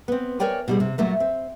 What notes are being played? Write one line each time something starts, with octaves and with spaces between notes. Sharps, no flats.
B3 C4
A#4 C#5 D5 G5 G#5
B2 G3 G#4
C3
A#2 F#3 A3 A#3
C4